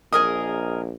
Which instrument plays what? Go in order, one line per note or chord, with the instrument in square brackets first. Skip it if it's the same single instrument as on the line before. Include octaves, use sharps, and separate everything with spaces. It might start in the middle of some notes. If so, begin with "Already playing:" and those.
[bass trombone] A#1 [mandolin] G#4 A#4 D#5 [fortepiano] D#6